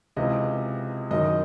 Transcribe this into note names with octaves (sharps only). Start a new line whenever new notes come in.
C#2 C3 E3 D#5
F#2 D#3 D#5